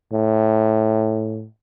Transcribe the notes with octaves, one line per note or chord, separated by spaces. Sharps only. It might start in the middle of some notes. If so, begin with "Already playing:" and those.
A2